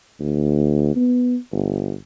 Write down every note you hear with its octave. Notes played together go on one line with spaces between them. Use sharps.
D2
B3
G1